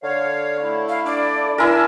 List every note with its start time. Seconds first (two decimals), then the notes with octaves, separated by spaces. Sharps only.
0.03 D3 C#5 F5
0.62 A3 E4
0.89 F5
1.06 D4 D5
1.58 D4 E4 A#4 G#5 A5